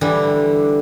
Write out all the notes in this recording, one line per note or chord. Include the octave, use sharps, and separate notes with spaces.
D3 E3 G3